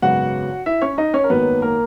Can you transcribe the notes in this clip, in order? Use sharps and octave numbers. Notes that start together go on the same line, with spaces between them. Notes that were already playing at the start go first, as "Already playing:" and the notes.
G#1 F#2 C#3 F#3 B3 F#4 F#5
E4 E5
C#4 C#5
D#4 D#5
C#4 C#5
A#4
G#1 F#2 D#3 F#3 A#3 B3 B4
A#3 A#4